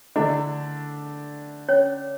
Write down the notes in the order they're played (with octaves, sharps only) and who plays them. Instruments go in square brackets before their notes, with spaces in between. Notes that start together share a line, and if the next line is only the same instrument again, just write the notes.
[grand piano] D3 A3 D4 [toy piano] E4
[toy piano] C#4 C#5